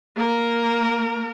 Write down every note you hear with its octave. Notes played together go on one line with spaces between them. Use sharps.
A#3 A#4